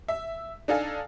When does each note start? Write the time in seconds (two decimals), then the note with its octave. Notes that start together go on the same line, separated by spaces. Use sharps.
0.08 E5
0.68 D4 D#4 A4 F5 G#5